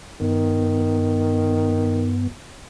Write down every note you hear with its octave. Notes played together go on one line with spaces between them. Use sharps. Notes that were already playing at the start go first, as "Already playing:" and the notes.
G2 D#3 B3